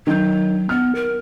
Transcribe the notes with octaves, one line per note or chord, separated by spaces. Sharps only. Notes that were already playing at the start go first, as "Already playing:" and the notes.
D#3 F#3 G6
B3 F6
A#4